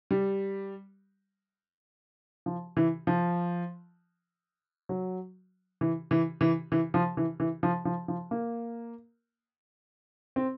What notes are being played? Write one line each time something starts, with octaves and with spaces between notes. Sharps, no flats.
G3
F3
E3
F3
F#3
E3
E3
E3
E3
F3
E3
E3
F3
F3
F3
A#3
C4